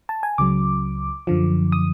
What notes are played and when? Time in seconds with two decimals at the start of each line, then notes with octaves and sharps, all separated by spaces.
0.09 A5
0.23 G#5
0.38 C#2 C#3 F#3 D6
1.27 F#2 D3 F3
1.72 D#6